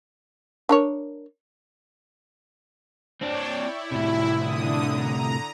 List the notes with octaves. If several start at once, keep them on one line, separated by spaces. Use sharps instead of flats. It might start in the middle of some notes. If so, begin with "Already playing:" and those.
D4 A#4 C#5
C4 D4 C#5 D5 G5
E4
A2 C3
D3 D#6
A#5